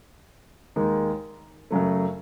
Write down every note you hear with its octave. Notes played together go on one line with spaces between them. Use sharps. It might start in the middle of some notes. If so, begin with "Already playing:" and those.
D#2 D#3 G#3 D#4
F#2 C#3 F#3 A3